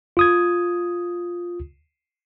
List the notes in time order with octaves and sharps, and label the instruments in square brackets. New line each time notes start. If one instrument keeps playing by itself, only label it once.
[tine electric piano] F4 D#6 G#6